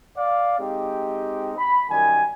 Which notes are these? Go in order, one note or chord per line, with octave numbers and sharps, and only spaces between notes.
D5 F5
G#3 C4 D#4 G4
B5
F#2 D#3 G3 G#5